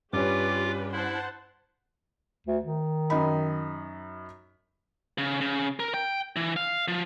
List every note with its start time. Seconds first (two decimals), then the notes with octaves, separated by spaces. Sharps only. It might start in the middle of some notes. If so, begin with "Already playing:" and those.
0.13 G2 C#4 F4 G4 B4 D6
0.92 E4 C5 F#5 A5
2.47 D2
2.65 D#3
3.10 F#2 D#4 B5
5.18 C#3
5.41 C#3
5.80 A#4
5.94 G5
6.36 E3
6.56 F5
6.88 F3